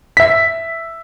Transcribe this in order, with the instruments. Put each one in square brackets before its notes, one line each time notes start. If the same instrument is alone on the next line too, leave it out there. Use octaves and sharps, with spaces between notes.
[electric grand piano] E5 B6